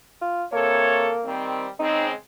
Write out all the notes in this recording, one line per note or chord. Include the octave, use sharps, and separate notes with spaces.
F4
C3 A#3 A4 C#5
D#3 G3 C4
C#3 G#3 C4 D#4